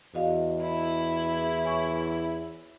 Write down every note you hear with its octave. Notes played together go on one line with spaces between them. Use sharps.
E2 F#4 D#5 F5
E4
C#5 G#5 C#6